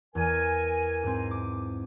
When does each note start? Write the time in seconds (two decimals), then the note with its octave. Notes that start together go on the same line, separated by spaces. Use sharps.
0.15 E2 A#4 G#5
1.03 G#2 C4
1.31 D6